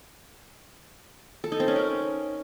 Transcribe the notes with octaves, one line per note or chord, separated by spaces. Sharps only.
A4
D#4
C4
C#4
A#4